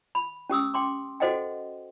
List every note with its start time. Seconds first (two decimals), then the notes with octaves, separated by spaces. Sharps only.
0.15 B5
0.50 C#4 G4 D#6 E6
0.74 G5 C6 D6
1.20 F#4 A4 C5 D#5 F#5 G5